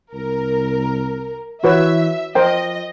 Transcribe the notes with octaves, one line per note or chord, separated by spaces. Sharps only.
C2 A#4
E3 F#4 B4 C#5 E5
F3 A#4 C5 D#5 G5